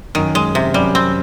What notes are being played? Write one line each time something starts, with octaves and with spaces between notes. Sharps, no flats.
F#2 D#3
G#3
C3
F#2 G3
C4